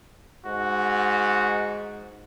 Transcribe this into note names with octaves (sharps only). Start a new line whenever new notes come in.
G#2 F#4